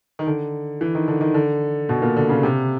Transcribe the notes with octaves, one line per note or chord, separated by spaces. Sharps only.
D#3
D3
E3
D#3
D3
D#3
D3
B2
A#2
D3
C#3
C3